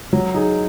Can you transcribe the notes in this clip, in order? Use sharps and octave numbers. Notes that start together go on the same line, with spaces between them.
F#3
D#4 G#4